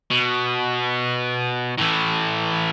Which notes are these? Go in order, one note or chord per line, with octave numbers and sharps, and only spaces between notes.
B2
A2 E3